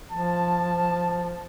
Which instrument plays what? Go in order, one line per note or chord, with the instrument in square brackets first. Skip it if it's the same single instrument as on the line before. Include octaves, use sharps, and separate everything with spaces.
[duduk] F3 [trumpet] A5